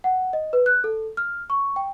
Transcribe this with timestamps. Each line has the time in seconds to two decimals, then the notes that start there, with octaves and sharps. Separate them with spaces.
0.04 F#5
0.33 D#5
0.53 B4
0.66 F#6
0.84 A4
1.17 F6
1.50 C#6
1.76 G5